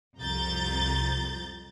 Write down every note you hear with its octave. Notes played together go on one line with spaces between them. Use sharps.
C2 F2 A#5 G6 A6